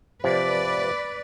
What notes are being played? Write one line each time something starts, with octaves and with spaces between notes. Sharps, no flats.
C3 F3 B4 D5